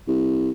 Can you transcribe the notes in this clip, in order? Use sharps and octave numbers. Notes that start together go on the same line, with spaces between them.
C2